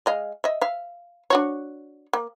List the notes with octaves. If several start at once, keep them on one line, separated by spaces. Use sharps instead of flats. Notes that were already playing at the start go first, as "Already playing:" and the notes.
G#3 D#5 F5
D#5 E5
E5 F5
D4 F#4 C#5
A#3